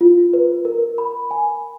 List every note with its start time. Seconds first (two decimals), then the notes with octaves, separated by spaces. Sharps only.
0.01 F4
0.33 B4
0.65 A#4
0.98 B5
1.31 G#5